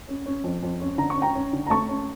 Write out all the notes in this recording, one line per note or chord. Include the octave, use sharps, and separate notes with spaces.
C#4
C#4
F2
F2
C#4
D3 A#5
C#6
C#4
G5 A#5
C#4
D3
A#5
A3 A5 C#6
C#4